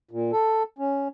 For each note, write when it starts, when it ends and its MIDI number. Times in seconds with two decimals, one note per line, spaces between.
0.11 0.32 46
0.32 0.63 69
0.78 1.08 61